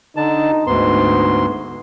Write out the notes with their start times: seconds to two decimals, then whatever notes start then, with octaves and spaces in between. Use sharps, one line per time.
0.16 D3 D#4 A5
0.67 D2 G#2 B3 C6